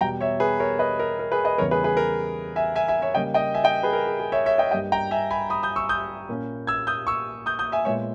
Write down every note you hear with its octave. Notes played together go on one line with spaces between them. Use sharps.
E2 B2 G3 G5 A#5
C#5 E5
G#4 B4
A#4 C#5
B4 D#5
A#4
A#4
G#4 B4
B4 D#5
E2 C#3 E3 G3 B3 A#4 C#5
G#4 B4
G#4 B4
A#4
E5 G#5
E5 G#5
E5 G#5
C#5 E5
C#3 G3 A#3 D#5 G5
D#5 G5
E5 G#5
D#5 G5
G#4 B4
A#4
G#4
G#4
C#5 E5
C#5 E5
D#5 G5
G2 G3 A#3 D#5 G5
G5 A#5
E5 G#5
G#5 B5
B5 D#6
D#6 G6
C#6 E6
D#6 G6
A#2 A#3 C#4
E6 G#6
D#6 G6
C#6 E6
D#6 G6
D#6 G6
E5 G#5
A#2 G#3 B3 C#5 E5